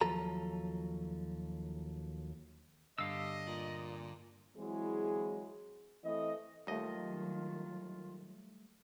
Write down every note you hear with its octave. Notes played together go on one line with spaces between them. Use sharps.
D#2 F3 F#3 A4 A#5
G2 D3 G4 D#5 F5 E6
A#2 D5
E3 F#3 G#3 C4 E4 G#4
E3 A3 C4 D#5
D#2 D#3 F#3 G3 A3 F4 D#5